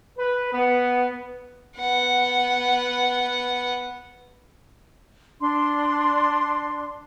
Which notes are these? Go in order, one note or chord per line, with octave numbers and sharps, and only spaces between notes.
B4
B3
B3 F#5
D4 C6